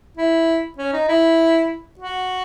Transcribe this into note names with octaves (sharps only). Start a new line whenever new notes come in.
E4
C#4
D#4
E4
F#4